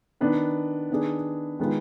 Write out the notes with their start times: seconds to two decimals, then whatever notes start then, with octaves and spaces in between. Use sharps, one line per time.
0.21 D#3 B3 D4
0.90 D#3 B3 D4 G#4
1.59 D#3 G#3 B3 F4